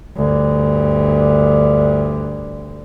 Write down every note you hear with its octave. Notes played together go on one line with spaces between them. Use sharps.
D2 G2